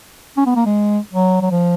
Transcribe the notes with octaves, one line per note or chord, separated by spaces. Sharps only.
C#4
B3
A#3
G#3
F#3
F#3
F3